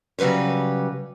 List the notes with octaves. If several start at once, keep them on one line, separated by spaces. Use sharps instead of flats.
C#3 F#3 G3 B4 C#5